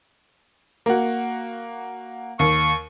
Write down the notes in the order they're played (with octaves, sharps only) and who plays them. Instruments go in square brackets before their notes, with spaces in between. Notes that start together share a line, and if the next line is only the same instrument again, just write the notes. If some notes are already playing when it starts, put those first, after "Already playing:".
[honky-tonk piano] A#3 F#4
[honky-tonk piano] D#2 [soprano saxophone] C#6